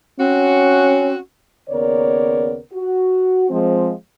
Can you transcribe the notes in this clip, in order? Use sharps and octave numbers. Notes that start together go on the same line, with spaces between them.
C4 C#4 F#4
D#2 C#3 B3 A#4 C#5 D5
F#4
F3 G#3 C4